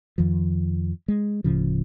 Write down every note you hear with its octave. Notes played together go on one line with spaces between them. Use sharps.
F2 D#3 F3
G#3
D1 A2 C#3 F3